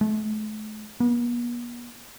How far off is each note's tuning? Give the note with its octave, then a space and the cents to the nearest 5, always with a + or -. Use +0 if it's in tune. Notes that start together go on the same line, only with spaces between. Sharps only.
A3 -40
B3 -45